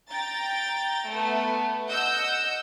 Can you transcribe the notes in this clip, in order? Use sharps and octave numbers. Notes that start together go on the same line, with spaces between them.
G5 A#5 A6
A3 B3
D#5 F#5 E6 G6